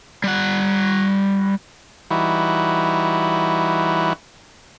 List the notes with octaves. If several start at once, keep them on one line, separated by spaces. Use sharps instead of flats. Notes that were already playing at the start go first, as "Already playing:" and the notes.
G3 F#5
E3 G3 D#4 E4 F#4